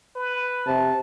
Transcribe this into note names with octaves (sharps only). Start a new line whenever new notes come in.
B4
C3 A5